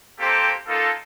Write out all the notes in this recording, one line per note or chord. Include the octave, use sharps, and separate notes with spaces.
A#3 C4 G4 A4 C5
A#3 D#4 F4 A4